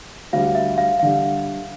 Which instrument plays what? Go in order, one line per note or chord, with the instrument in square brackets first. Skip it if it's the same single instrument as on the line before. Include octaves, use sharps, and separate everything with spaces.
[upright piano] D2 D3 G3 [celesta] F5
[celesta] E5
F5
F5
[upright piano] D3 G3